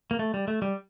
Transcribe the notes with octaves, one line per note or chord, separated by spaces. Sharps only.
A#3
A3
G3
A3
G3